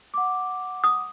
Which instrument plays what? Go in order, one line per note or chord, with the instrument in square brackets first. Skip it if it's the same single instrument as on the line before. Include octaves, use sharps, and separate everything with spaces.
[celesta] F#5 D6
[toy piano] D#6